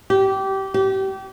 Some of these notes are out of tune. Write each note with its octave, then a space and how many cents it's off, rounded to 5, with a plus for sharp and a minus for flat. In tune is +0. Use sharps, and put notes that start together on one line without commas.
G4 -20
G4 -30